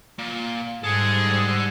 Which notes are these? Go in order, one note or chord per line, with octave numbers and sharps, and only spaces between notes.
A#2
G#2 G3 G#4 A4 F#5